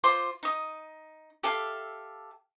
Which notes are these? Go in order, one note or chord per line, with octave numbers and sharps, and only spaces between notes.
F4 C5 C6 D6
D#4 D#6
G4 A4 E5 F5